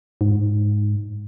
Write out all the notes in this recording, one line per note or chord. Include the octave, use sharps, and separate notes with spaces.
G#2